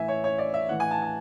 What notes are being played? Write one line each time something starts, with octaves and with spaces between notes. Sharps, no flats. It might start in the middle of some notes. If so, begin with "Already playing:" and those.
Already playing: A2 E3 E5 G#5
C#5
C#5
D5
E5
A2 E3 F#5
G#5
A5
A5